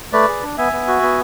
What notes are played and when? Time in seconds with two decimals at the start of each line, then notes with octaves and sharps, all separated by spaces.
0.13 A3 B4 D5
0.28 G#4
0.43 D4
0.58 B3 E5 G#5
0.72 B3
0.88 F#4
1.03 B3